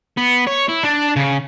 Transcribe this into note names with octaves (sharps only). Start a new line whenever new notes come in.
B3
C#5
E4
D4
C#3